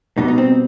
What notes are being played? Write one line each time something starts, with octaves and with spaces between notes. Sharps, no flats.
B2 G3 D#4
D#4
C4